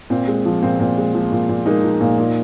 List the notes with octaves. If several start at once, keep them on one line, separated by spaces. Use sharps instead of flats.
A#2 C4
G#3
F3
A#2 C4
A#2
G#3
F3
A#2
A#2
G#3 A#3 D#4
F3
A#2
A#2